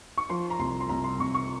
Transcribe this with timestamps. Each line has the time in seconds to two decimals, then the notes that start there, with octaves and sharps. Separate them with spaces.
0.18 C#6
0.30 F3 C6
0.50 A#5
0.59 C2 C6
0.80 C6
0.89 C2 A#5
1.04 C6
1.19 C2 C#6
1.34 C#6